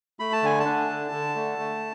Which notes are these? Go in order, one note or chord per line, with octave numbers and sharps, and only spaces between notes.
A3 B5
A5
D3 G#5
A5
D4
D3
D3
A3
A3